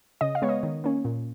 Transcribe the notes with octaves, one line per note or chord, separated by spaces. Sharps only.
C#3 D#5
F5
G#3 B3 C#5
D#5
D#3
A#3 C#4
A#2